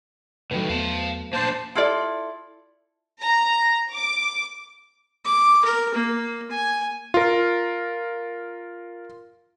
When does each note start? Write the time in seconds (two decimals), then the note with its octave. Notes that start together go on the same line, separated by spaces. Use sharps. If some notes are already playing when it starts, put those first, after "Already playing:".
0.51 A2 D#3 F#3 A3 B4
0.69 E2 B3 F5 A5
1.33 A#3 D4 C5 A5
1.75 E4 F4 A4 D5
3.23 A#5
3.95 D6
5.25 D6
5.65 A#4
5.94 A#3
6.51 G#5
7.14 F4 A#4